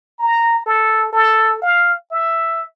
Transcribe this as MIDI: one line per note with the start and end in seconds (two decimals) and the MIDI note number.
0.19 0.63 82
0.66 1.12 69
1.12 1.60 69
1.62 1.93 77
2.11 2.62 76